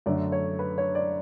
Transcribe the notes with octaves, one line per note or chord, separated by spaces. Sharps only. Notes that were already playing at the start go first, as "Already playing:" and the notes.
F#2 D3 A3 D4 D5
C#5
B4
C#5
D5